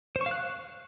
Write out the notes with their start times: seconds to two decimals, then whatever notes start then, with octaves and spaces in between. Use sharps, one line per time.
0.16 C5
0.21 C#6
0.26 F5
0.31 F#6